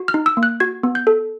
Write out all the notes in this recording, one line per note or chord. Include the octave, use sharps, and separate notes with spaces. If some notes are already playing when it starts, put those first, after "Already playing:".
Already playing: F#4
F6
D#4
E6
A#3
F#6
F#4 G#6
B3
G6
A4